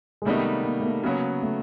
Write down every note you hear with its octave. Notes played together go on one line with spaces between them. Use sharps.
G#3
C3 D#3 G3 A3 B3 D#4
A#3
A3
A#3
C#3 F#3 A#3 B3
A3